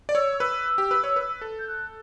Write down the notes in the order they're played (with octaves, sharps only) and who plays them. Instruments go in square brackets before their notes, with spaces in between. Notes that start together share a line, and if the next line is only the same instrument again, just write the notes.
[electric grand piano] D5
[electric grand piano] C#5 [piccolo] E6
[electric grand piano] B4 [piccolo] E6
[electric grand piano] G4
B4
C#5
B4
A4
[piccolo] G6
F#6